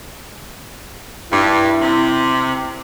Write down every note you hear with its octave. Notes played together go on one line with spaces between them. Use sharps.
G2 E4
C3